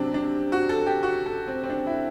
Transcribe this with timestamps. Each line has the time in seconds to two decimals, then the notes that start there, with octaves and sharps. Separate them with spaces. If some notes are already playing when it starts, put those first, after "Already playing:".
Already playing: C3 F#3 C4 D4
0.14 D4
0.52 F#4
0.69 A4
0.86 G4
1.03 F#4
1.26 A4
1.48 C4
1.63 C4
1.69 D4
1.87 E4